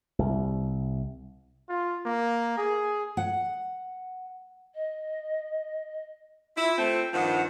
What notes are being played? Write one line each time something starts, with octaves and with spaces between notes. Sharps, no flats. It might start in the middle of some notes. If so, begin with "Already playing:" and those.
C2
F4
A#3
G#4
F#5
D#5
E4 F4
A3 C4
G2 D#3 F3 F#5